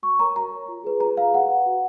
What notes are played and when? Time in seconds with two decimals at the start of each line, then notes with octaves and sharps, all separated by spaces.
0.03 F#4 C#6
0.19 A#4 C#5 A#5
0.36 F#4 A#5
0.52 A#4 C#5
0.68 F4
0.84 G#4 B4
1.00 F4 A#5
1.17 G#4 B4 F5
1.34 F#4 F#5
1.49 B4
1.66 F#4